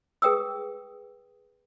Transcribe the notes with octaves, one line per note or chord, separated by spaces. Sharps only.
G#4 B4 G5 D#6 E6